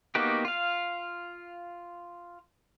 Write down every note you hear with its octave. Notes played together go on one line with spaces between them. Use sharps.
A#3 B3 D#4 F#4 G4
F4 F5